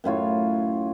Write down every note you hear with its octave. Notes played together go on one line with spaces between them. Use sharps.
F#2 A2 F4 C#5